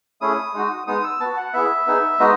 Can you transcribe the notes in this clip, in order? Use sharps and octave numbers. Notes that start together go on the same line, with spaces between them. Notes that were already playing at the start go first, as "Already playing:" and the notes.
A3 C#4 E4 G#4 D#6
G#3 D#4 F#4
G#3 B3 D#4 D#6
E6
B3 F#4 A5
F#5
B3 E4 G#4 E5
B3 D#4 G#4
G#3 B3 D#4 F#4 D#5